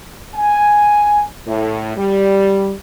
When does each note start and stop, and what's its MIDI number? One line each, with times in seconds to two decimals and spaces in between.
0.35 1.21 80
1.47 1.96 45
1.97 2.73 55